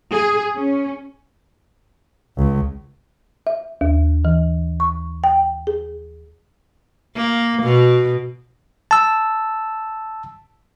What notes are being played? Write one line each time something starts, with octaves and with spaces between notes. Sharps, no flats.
G#4
C#4
C#2
E5
D#2
E3
C#6
G5
G#4
A#3
B2
A5 E6